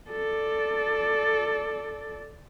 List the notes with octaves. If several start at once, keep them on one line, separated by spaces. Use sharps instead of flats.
A4 D5